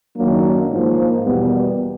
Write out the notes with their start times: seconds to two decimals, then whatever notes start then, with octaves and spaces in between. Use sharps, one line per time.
0.16 F#2 D#3 F#3 A#3 D4
0.69 G#2 F3 A#3
1.23 E2 B2 G3 B3